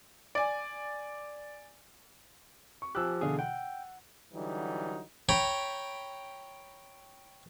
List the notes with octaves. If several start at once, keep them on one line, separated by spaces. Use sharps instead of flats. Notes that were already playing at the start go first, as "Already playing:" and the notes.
D5 G#5
C#6
F3 G4 G#5 E6 F#6
B2 D3 E3 G#4 F5
F#5 G5
D3 E3 F#3 G3 D#4
C#5 G5 A#5 B5